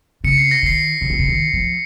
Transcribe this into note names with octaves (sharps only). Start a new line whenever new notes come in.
C#3 C#7
C7
A#6
D#3 C7
C#3
D#3
C#3
D#3
F3